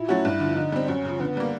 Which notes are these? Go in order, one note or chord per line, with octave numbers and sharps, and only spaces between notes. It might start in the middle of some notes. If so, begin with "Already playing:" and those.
Already playing: A#2 E4
F#3 A3 C#4 F#4
G2
D3 F3
D3 D#4
G3 C4
F#2 C#4
C#3 F3
D3 B3
G3 A#3